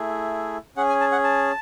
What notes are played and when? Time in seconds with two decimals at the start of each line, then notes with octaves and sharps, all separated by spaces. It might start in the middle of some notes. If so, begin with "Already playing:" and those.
Already playing: A3 E4 G#4
0.77 C#4 G#4 F#5
0.89 G#5
1.00 A5
1.12 F#5
1.24 A5